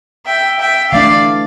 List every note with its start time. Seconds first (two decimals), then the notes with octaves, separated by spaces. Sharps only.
0.26 E5 G5
0.60 E5 G5
0.92 E3 A3 D4 D5 F5